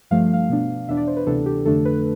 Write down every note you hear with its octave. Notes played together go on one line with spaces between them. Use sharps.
G2 F3 A3 F5
F5
B2 B3 D4
E2 B2 B3 D4 E5
D5
C5
B4
D2 C3 E3 B3 D4 A4
G4
F2 D3 A3 D4 A4
B4